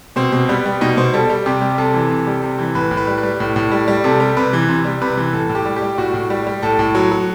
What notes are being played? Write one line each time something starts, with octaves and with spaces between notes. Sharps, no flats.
B2 C4
B2
G3 B3
G3
B2 D#4
B2 C5
G3 A4
G3
C3 G4
G3
C3 A4
E3
C3
G3
C3
E3
A2 B4
A2
B4
G3
B4
G3
A2
A2
G3
G3
C3 A4
G3
C3 B4
E3
C3
G3
C3 B4
E3
A2 A4
A2
G4
G3
G4
G3
A2 F#4
A2
G3
G3
A2 A4
A2
F#3
F#3